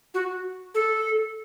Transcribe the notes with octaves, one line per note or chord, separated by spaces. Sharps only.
F#4
A4